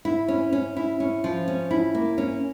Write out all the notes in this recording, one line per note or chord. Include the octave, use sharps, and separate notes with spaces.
E4
C#4
C#4
E4
C#4
F3
C#4
E4
A#3
C#4